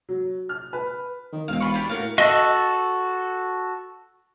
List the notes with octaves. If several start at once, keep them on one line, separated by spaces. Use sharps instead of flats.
F#3
F6
B4
D#3
E1 C4 F5
F4 B5 C#6
D4 G4
A2 F#4 A#4 F5
F#4 A4 D#5